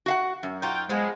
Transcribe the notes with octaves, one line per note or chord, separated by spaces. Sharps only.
F#4 F5 F#5
F#2
D#4 F4 F#4 G5
F3 G#3 B3 G#4